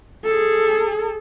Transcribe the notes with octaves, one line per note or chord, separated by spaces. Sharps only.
G#4 A4